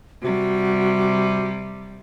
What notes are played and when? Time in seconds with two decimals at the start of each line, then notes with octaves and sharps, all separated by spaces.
0.22 C3 G3 F#4